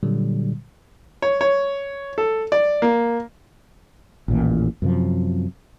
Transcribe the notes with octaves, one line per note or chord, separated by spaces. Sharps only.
A#2 D3 F#3 G3
C#5
C#5
A4
D5
A#3
A1 D#2 A#2 E3
F#2 C3 F3